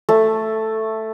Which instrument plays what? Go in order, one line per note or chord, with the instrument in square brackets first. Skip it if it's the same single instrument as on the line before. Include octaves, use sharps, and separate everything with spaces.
[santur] A3